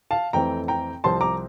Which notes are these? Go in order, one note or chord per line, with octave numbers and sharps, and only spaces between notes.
F5 A5
F2 E3 A3 C4 G5 A#5
G5 A#5
C2 C3 F3 C4 A5 C6
A#5 D6